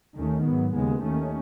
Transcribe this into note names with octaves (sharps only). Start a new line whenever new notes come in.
D#2 D#3 A3 C#4
G#2 F#3 B3
D#2 C#3 G#3 B3
D#2 D#3 A3 C#4